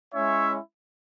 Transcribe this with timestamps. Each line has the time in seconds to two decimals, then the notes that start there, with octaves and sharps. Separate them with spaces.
0.14 G#3 C#4 E4 C#5 E5